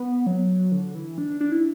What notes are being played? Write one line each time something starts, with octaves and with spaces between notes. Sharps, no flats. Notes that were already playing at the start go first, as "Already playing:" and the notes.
Already playing: B3
F#3
D3
E3
D4
D4
E4